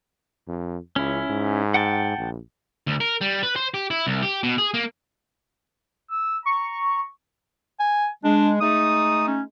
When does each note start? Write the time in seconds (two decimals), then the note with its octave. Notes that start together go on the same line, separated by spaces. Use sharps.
0.48 F2
0.96 C#2 C#4 E4
1.30 G#2
1.74 F#5 G5 A5
2.18 A#1
2.87 D2
3.00 A#4
3.21 G3
3.43 B4
3.56 C5
3.74 G4
3.90 E4
4.07 C2
4.23 G4
4.43 B2
4.58 G#4
4.74 A#3
6.10 E6
6.45 A#5 C#6
7.80 G#5
8.24 G#3 D4
8.61 G#3 A3 D#4 D#6
9.28 C#4